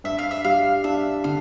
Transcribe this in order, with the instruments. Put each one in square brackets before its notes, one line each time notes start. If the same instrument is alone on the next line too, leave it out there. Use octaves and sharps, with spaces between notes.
[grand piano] G2 [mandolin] E5
[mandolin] F5
E5
[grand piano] G3 [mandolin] F5
[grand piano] D4 [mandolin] E5
[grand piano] D3 [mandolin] F5